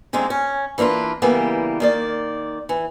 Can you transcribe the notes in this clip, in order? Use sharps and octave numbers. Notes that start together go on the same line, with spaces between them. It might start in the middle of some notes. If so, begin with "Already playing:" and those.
D3 D#3 G#3 A#3 C4
C#4
E3 A#3 D4 F4 B4
C#3 E3 G3 A#3 B3 G4
D#3 A#3 D5
E3